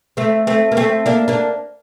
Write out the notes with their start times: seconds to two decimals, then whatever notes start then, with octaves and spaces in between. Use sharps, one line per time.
0.17 A3 C4
0.47 A3 C4
0.72 A#3
0.77 A3 C4
1.06 A#3 D4
1.28 A#3 D4